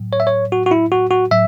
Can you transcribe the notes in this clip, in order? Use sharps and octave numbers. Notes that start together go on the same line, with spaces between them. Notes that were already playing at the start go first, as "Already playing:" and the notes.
Already playing: A2 F#3
C#5
E5
C#5
F#4
F#4
E4
F#4
F#4
A2 F#3 E5